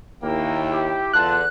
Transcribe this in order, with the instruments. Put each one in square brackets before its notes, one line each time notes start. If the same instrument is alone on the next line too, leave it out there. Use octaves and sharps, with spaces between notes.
[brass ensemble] D#2 [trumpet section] A#3 [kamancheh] E4 G5
[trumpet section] G4
[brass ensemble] E2 D3 [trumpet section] F4 A5 [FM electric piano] F#6